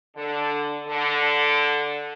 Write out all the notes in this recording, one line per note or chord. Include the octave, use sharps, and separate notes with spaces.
D3
D3